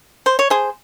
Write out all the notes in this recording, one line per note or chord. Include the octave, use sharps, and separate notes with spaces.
C5
C#5
G#4 C5